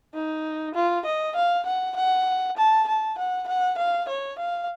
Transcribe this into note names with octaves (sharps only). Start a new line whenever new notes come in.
D#4
F4
D#5
F5
F#5
F#5
A5
A5
F#5
F#5
F5
C#5
F5